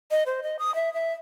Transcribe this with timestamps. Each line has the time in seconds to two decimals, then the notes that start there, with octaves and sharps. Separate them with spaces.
0.11 D#5
0.26 C5
0.43 D#5
0.59 D#6
0.75 E5
0.94 E5